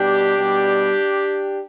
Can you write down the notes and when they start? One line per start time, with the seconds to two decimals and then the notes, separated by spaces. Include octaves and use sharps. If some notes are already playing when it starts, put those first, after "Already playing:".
Already playing: B2 G3 D4 G4
0.36 B2 G3